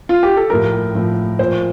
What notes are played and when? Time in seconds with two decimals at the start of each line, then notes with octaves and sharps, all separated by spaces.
0.09 F4
0.23 G4
0.37 A4
0.50 A2 F3 A#4
0.95 A2 F3
1.39 A#2 F3 C5